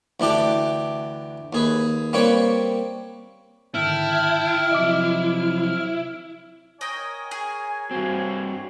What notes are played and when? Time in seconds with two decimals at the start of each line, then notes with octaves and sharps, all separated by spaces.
0.20 D2 E3 D4 G4 D6
1.53 D#2 G#4 B4
2.13 G3 A#3 C4 B4 C#5
3.74 G#2 D3 D#3 E4 G5 A5 F6
4.71 C3 F3 F#3 D#5 E5 D6
6.81 A#4 C#5 D#5 G5 G#5
7.31 G#4
7.91 G2 C4 F#4